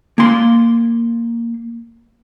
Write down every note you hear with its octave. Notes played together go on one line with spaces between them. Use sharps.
A#3 C6